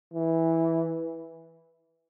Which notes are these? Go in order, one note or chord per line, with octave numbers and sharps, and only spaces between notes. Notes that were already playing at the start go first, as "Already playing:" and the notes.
E3